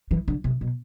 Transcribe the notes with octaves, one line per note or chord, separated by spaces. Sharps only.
E3
D3
C3
B2